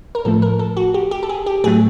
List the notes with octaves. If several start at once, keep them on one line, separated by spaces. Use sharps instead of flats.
A#4
A2 F3 A3 A4
A#4
A4
F#4
G4
G4
A4
G#4
G4
A2 F#3 A3 G#4